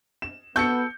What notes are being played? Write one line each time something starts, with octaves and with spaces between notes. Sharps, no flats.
E7
B3 F#4 A4 G6 C#7